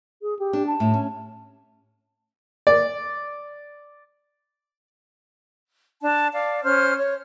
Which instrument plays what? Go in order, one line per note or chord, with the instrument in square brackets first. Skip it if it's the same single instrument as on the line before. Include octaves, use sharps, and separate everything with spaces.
[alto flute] G#4
G4
[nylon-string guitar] D4
[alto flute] A5
[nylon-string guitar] A2
C#4
[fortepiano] D5
[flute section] D4 A5
D5 F5
C#4 C5 F6
C#5